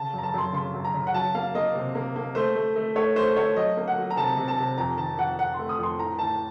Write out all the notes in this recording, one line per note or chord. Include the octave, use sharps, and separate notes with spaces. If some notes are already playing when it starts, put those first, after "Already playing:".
Already playing: C#3 A5
F#2 A#5
A5
F#2 C6
C#3 C6
F#2
A#5
C#3
F#5
F#3 A5
A#3 F5
A#3 D#5
C3
A#3
A#3
A3 C5
A3
A3
A3 C#5
A3 C5
A3 C#5
F#3 D#5
A#3
F#5
F#3
A#5
C3 A5
C3
A5
C3
F2 A#5
D#3 A5
F2 F#5
F2 F#5
A3 C6
D#6
F2 C6
A2 A#5
A2 A5